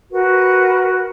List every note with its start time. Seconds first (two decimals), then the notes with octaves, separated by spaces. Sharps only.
0.11 F#4 A#4 B4